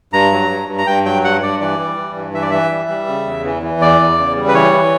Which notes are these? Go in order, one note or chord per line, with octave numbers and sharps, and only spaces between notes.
G2 A#5
F#3
G2
G2
A#5
G2 G5
F#3 G5
G2 F#5
G2 D5
E3 D5
G3
E3
G2
E3 E5
D5
E3 E5
G3
G3
C#3
E2
E3
E3
E2 D5
E2
C#3
G3
B4
E3 C#5
E3